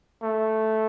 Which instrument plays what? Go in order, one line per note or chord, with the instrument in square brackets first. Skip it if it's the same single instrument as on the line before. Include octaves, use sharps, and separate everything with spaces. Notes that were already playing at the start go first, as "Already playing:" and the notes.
[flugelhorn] A3